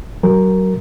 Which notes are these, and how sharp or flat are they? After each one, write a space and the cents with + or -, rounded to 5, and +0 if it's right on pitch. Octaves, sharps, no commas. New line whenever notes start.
F#3 +25 A#4 +0